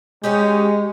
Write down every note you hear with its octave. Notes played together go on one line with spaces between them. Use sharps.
G#3 C#4 D#4 G4